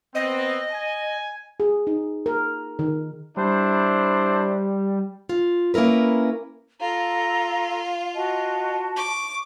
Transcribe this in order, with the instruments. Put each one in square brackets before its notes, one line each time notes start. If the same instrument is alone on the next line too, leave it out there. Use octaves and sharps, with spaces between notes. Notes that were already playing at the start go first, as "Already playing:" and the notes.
[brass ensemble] B3 C4 [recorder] D#5
[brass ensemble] G#5
[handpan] G#4
D#4
A#4
D#3
[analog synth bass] G3 [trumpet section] D4 E4 C5
[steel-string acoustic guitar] F4
A#3 C#4 E4 A#4 B4
[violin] F4 [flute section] A4 A#5 [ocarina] F5
[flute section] F#4 [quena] D#5 [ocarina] A5
[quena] C#6 [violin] D6